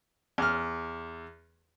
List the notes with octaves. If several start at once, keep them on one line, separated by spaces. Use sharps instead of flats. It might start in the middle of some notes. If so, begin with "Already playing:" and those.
E2 F6